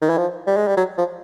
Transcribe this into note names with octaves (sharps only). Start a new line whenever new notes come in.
D#3
E3
F3
G3
G#3
G3
F#3
F3